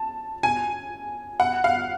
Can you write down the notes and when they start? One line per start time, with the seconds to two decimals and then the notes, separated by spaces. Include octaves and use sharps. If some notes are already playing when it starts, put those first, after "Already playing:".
Already playing: A5
0.43 G#5
1.40 F#5
1.64 F5